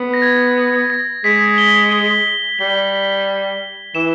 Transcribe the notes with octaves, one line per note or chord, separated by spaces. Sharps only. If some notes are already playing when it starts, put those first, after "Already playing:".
Already playing: B3
A#6
G#6
A#6
G#3 B6
G7
G7
G3 G7
E3 E7